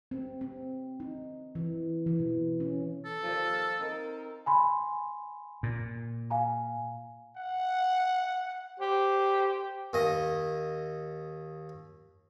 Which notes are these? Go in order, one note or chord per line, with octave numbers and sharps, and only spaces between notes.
C4
C4
D#4
E3
E3
B2
C#4
A4
D#2 A#2 F3
C4 D#4 A#4
G#5 B5 C6
A#2
F5 G#5 A#5
F#5
G4 C5
D#2 D#5